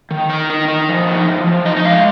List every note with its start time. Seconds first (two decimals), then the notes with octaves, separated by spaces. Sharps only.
0.11 D#3
0.29 D#4 A#4
0.50 D#4
0.68 D#4
0.89 F3
1.07 D#4
1.26 F3
1.47 F3
1.65 D#4 D#5
1.77 D#5
1.85 G#3 F5